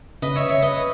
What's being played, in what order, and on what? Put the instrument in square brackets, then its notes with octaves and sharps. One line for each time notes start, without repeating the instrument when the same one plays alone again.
[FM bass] C#3 [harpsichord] B4 D#5
[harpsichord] C#5 E5
C#5 E5
B4 D#5